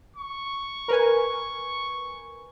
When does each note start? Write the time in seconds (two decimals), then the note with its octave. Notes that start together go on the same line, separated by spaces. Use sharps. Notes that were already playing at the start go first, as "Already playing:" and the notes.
0.16 C#6
0.88 A#4 B4 G#5